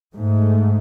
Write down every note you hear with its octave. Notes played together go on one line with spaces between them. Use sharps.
G#2 A3